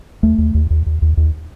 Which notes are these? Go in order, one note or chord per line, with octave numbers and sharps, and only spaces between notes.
D#2 A3
D#2
D#2
D#2
D#2
D#2
D#2